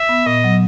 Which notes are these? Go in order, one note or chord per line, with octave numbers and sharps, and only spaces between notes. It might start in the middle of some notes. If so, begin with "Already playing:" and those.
Already playing: E5
B3
A#2 D#5
F#3